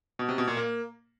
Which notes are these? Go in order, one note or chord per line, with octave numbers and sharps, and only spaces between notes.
B2
C3
B2
A#2
A#3